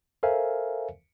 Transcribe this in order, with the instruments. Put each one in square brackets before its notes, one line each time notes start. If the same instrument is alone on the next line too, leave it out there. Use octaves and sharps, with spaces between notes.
[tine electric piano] A4 A#4 C5 E5 F5 G#5